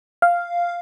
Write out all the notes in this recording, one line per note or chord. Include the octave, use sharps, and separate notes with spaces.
F5